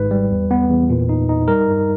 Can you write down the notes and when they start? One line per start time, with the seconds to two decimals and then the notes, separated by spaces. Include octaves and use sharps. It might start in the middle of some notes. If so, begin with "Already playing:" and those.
Already playing: G#1 G#2 B4
0.11 G3
0.31 E2
0.51 B3
0.70 E2
0.90 A#2
1.09 D#4
1.29 D#4
1.48 G3 A#4
1.68 G2